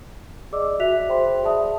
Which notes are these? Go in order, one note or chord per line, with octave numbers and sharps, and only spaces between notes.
G#4 D5 D#5 D6 E6
F#4 E5 F#6 B6 F7
G#4 C5 E5 G5 B5 C6
G#4 D5 E5 A5 D#6